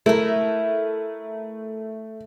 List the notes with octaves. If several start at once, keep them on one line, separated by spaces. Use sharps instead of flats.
A3 E4 A#4